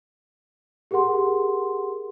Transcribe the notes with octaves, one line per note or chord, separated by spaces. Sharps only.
G4 G#4 A#4 F#5 C6